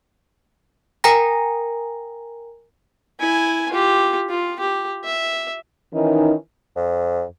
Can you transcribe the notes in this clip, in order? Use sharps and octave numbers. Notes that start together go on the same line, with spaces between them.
A#4 G5 G#5 A#5 A#6
E4 G#5
F4 G4
F4
G4
E5
D#3 E3 C#4 D#4
F2